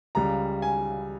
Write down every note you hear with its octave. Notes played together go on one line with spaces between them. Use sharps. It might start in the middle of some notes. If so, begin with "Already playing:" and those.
C#2 C#3 G3 A#5
G#5